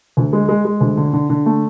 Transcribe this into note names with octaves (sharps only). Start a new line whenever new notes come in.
D2
G#3
G#3
G#3
D2
D3
D3
D3
A3